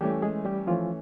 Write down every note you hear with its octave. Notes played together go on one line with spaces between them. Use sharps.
E3 G3 A3 C#4 G4
G#3 G#4
G3 G4
E3 F3 A3 C#4 F4